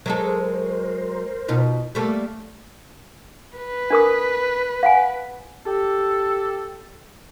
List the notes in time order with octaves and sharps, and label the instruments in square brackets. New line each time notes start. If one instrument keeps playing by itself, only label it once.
[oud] F#3 G#3 A4 [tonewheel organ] A#4 C5
[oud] B2 D#4 F4
G3 A3 A#3
[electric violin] B4
[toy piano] D4 A#4 D#6
F5 F#5 G#5
[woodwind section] G4 A4